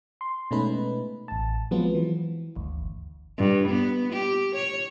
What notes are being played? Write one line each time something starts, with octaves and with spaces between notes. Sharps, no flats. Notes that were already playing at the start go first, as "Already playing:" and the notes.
C6
B2 G#3 A3 C#4 D#4 B4
A1 A5
F3 F#3 G#3 B3 C4 F4
E3
G1 D2
G2
B3
G4
C#5